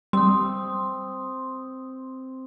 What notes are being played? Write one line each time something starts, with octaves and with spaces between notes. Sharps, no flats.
G3 C4 C6 D#6